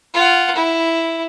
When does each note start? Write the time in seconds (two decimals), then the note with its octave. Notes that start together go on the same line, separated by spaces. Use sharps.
0.14 F4 F#5
0.55 E4